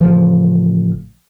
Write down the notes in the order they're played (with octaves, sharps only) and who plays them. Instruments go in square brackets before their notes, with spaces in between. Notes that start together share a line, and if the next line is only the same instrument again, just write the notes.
[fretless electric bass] A1 C#3 E3 F3